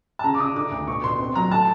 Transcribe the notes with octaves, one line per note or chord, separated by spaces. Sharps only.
A5
C#3 A#5
D6
C#3 D#6
D3 D6
D2
B2 C#6
B2 C6
C4
F#3 A#5
A3 A5